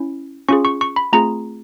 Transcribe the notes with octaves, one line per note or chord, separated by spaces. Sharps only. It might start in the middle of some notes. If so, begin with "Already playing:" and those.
Already playing: C#4 E4
C#4 F4 G#4 C#6
C#6
C#6
B5
A3 C4 F4 G#4 A#5